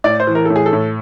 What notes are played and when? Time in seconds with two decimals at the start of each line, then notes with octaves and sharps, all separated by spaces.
0.04 A2 D5
0.20 C5
0.27 E3
0.35 A#4
0.45 A2 A4
0.56 G#4
0.66 A4
0.73 A2